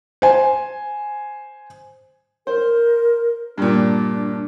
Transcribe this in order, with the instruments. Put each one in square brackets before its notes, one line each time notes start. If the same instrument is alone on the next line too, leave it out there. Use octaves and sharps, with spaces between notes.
[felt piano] C5 G#5
[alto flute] A#4 [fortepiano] C5
[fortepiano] G2 A#2 [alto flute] D4